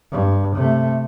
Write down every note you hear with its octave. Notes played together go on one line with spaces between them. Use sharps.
G2
C3 A3